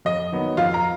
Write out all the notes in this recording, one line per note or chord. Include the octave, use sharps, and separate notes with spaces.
F2 D#5
D#3 F#3 B3
F2 F4 F5
A#5